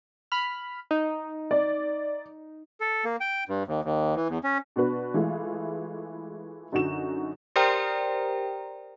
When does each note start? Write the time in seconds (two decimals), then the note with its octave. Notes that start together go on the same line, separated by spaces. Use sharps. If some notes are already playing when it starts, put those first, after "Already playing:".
0.32 B5 F6
0.91 D#4
1.51 D5
2.80 A4
3.05 A#3
3.21 G5
3.49 G2
3.67 D#2
3.84 D#2
4.16 E3
4.29 E2
4.43 C#4
4.76 B2 D4 F#4 B4
5.14 E3 G#3 A3 E4 F4
6.72 F#2 D3 D#4 F#4 E7
7.56 G4 A#4 C5 D5 G5 A#5